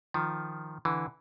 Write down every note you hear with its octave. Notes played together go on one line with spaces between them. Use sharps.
D#3 F3
D3 E3